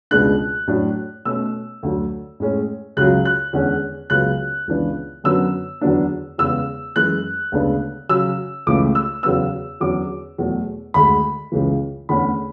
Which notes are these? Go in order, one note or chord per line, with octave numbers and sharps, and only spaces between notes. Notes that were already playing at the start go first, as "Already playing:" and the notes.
C#2 B2 G#3 B3 D4 F#6
A2 F#3 A3 D4
B2 A3 C#4 E6
D2 D3 F#3
A2 G#3 C#4
C#2 C#3 F#3 F#6
F#6
E2 D3 G#3 C#4
C#2 C#3 F#3 B3 F#6
C#2 C#3 E3 B3 D4
F#2 D3 F#3 B3 E6
E2 D3 F#3 B3 D4
E2 C#3 G#3 B3 E6
F#2 E3 G#3 F#6
D2 C#3 G#3 B3 D4
C#3 F#3 C#4 E6
C#2 C#3 E3 A3 D6
E6
E2 C#3 F#3 B3 E6
E2 D3 F#3 C#4 D6
E2 B2 F#3 A3
D2 D3 G#3 B5
C#2 C#3 E3
E2 D3 A3 C#4 B5